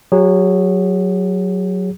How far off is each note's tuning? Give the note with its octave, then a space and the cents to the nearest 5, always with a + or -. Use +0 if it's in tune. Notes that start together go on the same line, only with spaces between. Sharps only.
F#3 +0 G#4 -35